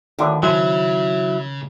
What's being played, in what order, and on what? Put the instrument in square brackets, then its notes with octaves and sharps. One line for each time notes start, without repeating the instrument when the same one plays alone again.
[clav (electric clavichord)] D2 A2 D3 [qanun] D#3
[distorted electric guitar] C#3 [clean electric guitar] F#3 E4 [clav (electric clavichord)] G#4 C5 A5